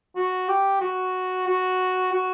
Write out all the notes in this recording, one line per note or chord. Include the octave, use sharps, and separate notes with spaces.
F#4
G4
F#4
F#4
F#4